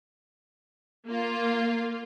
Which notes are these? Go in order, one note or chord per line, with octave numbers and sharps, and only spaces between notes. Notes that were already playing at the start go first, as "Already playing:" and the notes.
A#3 F4